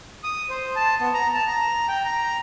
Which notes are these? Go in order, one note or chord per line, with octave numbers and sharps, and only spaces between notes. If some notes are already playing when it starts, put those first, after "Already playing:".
D#6
C5
A5
B3
A#5
A5
A#5
G5
A#5